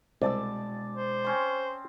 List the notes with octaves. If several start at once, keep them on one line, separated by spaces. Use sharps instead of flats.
C2 B2 G#3 D5 A5 E6
C5
C4 C#4 C6